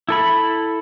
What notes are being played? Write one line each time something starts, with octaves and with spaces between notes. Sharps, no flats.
E4 A4 B5